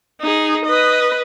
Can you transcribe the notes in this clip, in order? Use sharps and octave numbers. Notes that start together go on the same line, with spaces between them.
D#4 G#4
B4 D#5